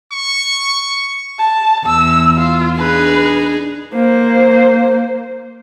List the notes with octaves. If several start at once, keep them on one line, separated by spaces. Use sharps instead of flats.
C#6
A5
E2 E6
F4
D4 D#4 G#4 B4
A#3 C5